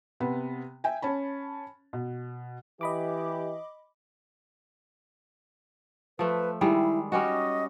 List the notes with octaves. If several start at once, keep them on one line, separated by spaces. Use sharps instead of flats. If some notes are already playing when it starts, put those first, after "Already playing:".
C3 B3
E5 G5 G#5
C#4 A5 B5
B2
E3 G4 D#5 B5 D6
F3 A3 B4
D#3 G3 G#3 E4
G3 C#4 F#4 D#5